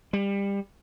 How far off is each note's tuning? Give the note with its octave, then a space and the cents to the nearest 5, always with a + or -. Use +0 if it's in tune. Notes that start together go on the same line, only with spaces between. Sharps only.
G3 +25